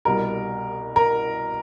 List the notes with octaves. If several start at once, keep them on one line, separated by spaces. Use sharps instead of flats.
C2 B2 G3 A#4
A#4